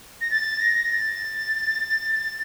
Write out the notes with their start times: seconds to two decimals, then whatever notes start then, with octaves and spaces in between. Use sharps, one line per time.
0.21 A#6
0.30 A6
0.61 A#6
0.91 A6
2.14 A6